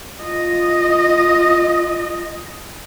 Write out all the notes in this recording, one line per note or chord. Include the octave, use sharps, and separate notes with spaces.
F4 D#5